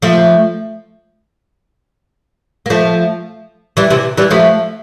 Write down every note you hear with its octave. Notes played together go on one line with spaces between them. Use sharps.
F3 A3
A#3
F3 A3
E3 G3
C3 E3
E3 G3
F3 A3